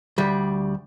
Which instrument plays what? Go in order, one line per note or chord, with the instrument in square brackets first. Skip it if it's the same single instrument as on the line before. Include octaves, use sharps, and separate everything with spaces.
[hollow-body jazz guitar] D2 G3